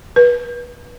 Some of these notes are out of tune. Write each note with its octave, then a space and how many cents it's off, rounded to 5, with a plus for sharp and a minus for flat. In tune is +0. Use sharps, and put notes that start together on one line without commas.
B4 -35